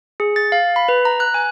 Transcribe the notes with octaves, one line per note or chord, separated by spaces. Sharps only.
G#4
A6
F5
B5
B4
A#5
F#6
G#5